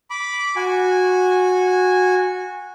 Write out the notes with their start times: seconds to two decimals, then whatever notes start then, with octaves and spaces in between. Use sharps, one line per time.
0.10 B5 D6
0.56 F#4 G#5